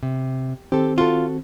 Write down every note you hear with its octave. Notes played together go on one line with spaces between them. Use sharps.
C3
D#3 C4 G4 A4
F4 F#4 A4